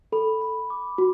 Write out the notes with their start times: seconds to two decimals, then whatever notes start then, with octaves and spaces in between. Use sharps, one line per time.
0.12 A4 B5
0.41 B5
0.70 D6
0.98 F#4